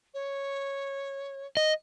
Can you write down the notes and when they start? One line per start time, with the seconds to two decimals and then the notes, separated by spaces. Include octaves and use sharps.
0.14 C#5
1.57 D#5